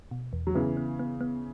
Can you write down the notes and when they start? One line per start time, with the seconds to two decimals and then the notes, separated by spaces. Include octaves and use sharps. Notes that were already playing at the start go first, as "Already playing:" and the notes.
0.11 B2
0.33 E2
0.47 F#3
0.55 C#3 E3 B3
0.77 B3
0.99 B3
1.21 B3